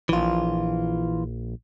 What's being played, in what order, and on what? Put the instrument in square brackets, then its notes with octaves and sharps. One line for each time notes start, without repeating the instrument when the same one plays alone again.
[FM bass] A#1 [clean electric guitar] E3 F4